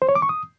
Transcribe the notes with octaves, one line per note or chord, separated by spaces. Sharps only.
C5
C#5
D6
C#6
D#6